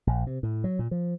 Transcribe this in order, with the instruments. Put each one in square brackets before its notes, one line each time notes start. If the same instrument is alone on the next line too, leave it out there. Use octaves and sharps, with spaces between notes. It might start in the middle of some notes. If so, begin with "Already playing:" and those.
[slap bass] A#1
C3
A2
F#3
A#2
F3